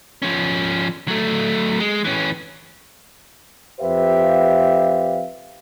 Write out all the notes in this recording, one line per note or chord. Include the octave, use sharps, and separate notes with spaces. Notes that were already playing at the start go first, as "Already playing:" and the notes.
F3 C#4
F#3 A3
G#3
E3 C#4
F2 G4 B4 C5 E5 F5